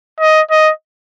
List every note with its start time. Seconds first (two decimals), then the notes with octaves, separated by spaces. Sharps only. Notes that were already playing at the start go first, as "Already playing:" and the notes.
0.20 D#5
0.51 D#5